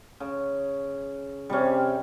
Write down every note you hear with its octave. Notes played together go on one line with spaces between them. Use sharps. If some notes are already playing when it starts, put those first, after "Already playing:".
C#3
C3 G3 C#4